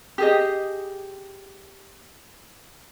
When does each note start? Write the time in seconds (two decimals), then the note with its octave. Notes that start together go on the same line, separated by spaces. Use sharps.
0.18 G4 G#4 D#5